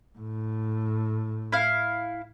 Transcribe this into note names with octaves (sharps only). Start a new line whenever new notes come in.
A2
E4 F5